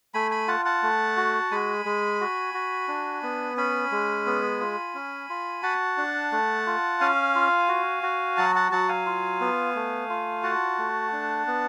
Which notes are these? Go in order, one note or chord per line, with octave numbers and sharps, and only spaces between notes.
A3 G#5 B5
G#5 B5
F4 F#5 A5
F#5 A5
A3
F#4
G#3 G#5 B5
G#3
F#4
F#4
D4
B3
C#4 G#5 B5
G#3
B3
F4
C#4
F4
F#4 F#5 A5
D4
A3
F4
C#4 F5 G#5
F4
F#4
F#4
F#3 F#5 A5
F#5 A5
F#3 F#5 A5
F5 G#5
F4
B3
A3
F4
F#4 F#5 A5
A3
D4
B3